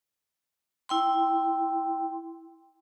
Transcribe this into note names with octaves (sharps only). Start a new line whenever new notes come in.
E4 G5 C6